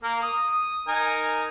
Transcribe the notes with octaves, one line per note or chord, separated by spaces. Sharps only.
A#3 A#4
D#6
D#4 A#4 G#5